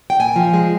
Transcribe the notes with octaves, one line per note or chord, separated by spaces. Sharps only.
G5
A#2 G#5
F3
G#3